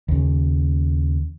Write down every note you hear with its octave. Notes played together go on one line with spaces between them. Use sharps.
D#2 C#3